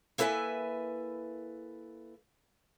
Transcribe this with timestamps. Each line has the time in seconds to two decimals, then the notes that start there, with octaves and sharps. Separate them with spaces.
0.18 A#3 E4 A4 B4 E5 G#5